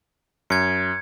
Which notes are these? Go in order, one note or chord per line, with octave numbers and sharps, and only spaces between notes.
F#2 G#6 C#7